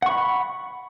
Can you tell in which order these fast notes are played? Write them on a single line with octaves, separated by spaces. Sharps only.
F#5 C#6 B5